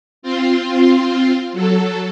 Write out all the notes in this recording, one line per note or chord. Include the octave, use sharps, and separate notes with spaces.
C4 F4 C5
F#3 A4